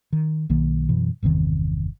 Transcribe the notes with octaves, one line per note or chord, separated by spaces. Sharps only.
D#3
B1 D#3 A#3
F#2 B2 E3
G1 E2 C3 D#3